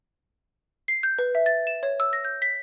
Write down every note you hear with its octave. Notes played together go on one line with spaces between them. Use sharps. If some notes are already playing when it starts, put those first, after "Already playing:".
C7
G6
B4
E5
A6
E7
C#5
E6
A#6
G6
B6